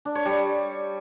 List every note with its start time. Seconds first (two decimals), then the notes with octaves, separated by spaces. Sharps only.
0.05 D4
0.15 C#5
0.25 G3